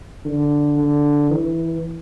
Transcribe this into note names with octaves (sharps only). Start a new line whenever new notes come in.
D3
D3
E3